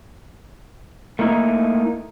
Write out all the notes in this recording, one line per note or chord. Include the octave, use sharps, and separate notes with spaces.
A3 A#3 D#4 E4